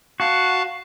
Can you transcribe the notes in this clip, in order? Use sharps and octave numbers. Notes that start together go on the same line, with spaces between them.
F#4 F5 A5